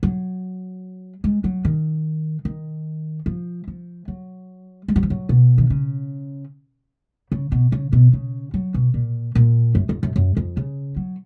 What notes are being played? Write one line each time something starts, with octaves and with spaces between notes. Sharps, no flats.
F#3
G#3
F#3
D#3
D#3
F3
F3
F#3
G#3
F#3
F3
F#3
B2
D#3
C#3
C#3
B2
C#3
B2
C#3
F#3
B2
A#2
A#2
F#2
F2
F#2
F#2
F2
C#3
F#3